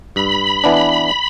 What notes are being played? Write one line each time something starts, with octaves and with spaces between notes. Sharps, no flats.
G2 B5
E3 B3 D4